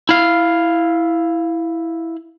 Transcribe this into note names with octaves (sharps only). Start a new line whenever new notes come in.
E4 F5